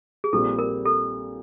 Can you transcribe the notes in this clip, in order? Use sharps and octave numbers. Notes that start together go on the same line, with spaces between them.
G#4
A#1 A#2 G3 C4 A4
A#4
A4